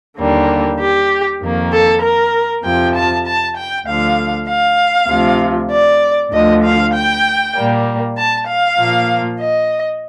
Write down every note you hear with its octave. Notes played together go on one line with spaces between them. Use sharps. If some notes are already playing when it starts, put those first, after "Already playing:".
D#2 D3 G3 A#3
G4
F2 D#3 A#3
A4
A#4
F2 C3 F3 G5
A5
A5
G5
D2 D3 F3 F5
F5
D2 C3 F3
D5
D2 D3 F3 D#5
F5
G5
A#2 G3 A#3
A5
F5
A#2 F3 A#3
D#5